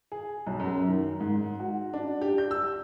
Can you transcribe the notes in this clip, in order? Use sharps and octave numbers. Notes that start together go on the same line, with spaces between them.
G#4
B1
F#2
D#3
G#2
F#4
D4
G4
G6
E6